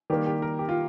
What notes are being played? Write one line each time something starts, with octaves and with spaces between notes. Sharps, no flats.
D#3 G3 A#3 G4
G4
A#4
G4
F4